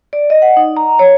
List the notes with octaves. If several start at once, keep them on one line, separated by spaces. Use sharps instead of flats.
D5
D#5
F#5
D#4
A#5
C#5